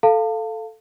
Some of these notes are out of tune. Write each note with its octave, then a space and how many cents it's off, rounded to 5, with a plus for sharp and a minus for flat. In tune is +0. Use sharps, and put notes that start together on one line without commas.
A4 +0 F5 -5 A5 +35